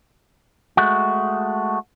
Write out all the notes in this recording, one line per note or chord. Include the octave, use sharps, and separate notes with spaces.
G#3 A3 F#4